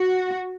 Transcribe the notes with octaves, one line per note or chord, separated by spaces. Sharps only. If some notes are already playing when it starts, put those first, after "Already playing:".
Already playing: F#4